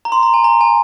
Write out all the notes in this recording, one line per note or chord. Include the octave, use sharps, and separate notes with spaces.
A#5
C6
A#5
G#5
A#5
G#5